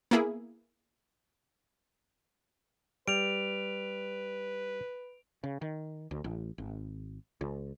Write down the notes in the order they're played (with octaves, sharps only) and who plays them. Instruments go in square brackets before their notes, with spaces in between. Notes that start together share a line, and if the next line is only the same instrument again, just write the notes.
[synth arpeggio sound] A#3 B3 E4 G#4
[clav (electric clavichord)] G3 [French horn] B4 [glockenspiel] D7 F7
[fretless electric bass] C#3
D#3
D2
A1
G#1
C#2